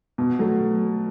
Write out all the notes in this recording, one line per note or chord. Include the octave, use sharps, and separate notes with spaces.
B2
F#3 A3